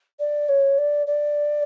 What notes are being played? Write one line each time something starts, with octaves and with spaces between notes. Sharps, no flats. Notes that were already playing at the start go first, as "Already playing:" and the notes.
D5
C#5
D5
D5